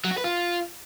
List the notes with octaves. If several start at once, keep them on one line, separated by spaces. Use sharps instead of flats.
F#3
F#4
B4
F4